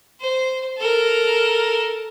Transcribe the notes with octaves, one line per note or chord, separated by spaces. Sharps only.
C5
A4 A#4